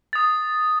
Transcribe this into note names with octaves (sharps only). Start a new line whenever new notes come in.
D#6 A6